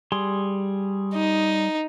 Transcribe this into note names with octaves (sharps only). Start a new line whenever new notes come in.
G3 G#4 C6
D#4